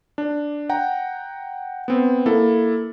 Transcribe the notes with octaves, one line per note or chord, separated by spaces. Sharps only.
D4
F#5 G5 A#5
B3 C4
A#3 E4 A4